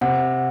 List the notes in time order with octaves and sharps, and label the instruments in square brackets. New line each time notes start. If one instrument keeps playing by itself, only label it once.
[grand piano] C3 [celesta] F#5